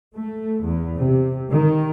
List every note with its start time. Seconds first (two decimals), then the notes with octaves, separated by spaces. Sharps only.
0.16 A3
0.64 E2
0.98 C3
1.51 D#3